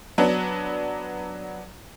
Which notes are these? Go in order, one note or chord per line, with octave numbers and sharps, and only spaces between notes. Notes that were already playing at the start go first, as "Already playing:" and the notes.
F#3 B3 D4